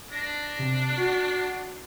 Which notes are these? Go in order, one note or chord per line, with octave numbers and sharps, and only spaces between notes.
D4 A#6
C3
F#4